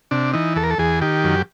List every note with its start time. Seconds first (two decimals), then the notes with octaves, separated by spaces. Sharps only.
0.11 C3 D4
0.33 E3 D#4
0.56 E2 A4
0.63 A#4
0.71 A4
0.78 E2 G#4
1.02 D#3 G4
1.24 F#2